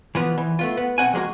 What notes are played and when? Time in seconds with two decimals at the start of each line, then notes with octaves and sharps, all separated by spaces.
0.15 E3 F3 B3
0.38 E3
0.59 A3 B3 F4
0.77 B3
0.98 B1 C4 F#5 G#5
1.14 F3 G#3 A#3 F#4